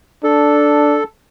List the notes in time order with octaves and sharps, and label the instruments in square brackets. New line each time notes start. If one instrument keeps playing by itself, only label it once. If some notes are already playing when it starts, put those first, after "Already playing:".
[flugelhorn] D4 [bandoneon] A4